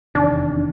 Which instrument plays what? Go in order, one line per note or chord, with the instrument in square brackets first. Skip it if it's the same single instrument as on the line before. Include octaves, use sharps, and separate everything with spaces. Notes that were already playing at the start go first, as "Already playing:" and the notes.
[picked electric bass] F1 E2 C3 D#3 [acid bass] D4